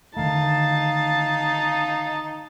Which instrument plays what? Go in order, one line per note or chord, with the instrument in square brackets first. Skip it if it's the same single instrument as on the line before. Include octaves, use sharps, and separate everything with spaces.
[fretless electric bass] D3 D#3 A3 [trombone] D#4 [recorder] F5 [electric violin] A5